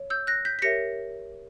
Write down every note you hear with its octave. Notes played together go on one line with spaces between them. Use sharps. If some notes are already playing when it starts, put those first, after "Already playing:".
Already playing: C#5
E6 G6
F#6 A#6
G6 B6
B6
G4 A#4 C#5 E5 A#6 C#7